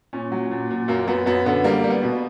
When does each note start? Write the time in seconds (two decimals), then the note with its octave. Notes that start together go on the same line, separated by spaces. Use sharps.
0.13 A#2 C#4
0.32 F#3
0.51 A#2
0.70 A#2
0.88 F#2 A#3
1.07 F#2 B3
1.26 F#2 B3
1.46 D3 B3
1.64 G3 A#3
1.84 G3
1.90 B3
2.03 B2